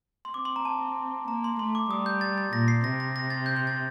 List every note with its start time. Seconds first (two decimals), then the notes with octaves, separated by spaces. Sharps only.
0.25 C6
0.34 C4 D6
0.45 C6
0.56 A#5
0.65 A5
1.28 A#3 A#5
1.44 C6
1.59 A3 C6
1.75 D6
1.90 G3 D#6
2.06 G6
2.21 A6
2.38 A6
2.52 A#2 A#6
2.68 C7
2.84 C3 A#6
3.00 A#6
3.16 A#6
3.30 A6
3.46 G6
3.56 G6
3.67 A6